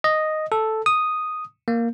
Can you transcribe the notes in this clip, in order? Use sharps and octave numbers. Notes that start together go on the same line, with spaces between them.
D#5
A4
D#6
A#3